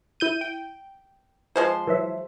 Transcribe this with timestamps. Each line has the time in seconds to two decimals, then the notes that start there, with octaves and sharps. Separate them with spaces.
0.20 E4 G6 D#7
0.41 G5
1.56 F3 G#3 C5
1.87 E3 F#3 E5